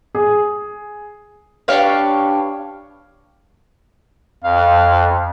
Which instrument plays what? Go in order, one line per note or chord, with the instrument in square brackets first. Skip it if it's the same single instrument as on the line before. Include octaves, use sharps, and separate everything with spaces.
[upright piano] G#4
[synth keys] D4 G4 B4 [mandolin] C#5 F5
[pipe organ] F2 [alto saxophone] F5